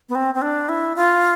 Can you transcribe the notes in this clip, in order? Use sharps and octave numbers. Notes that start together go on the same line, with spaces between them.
B3
C4
C4
D4
E4
F4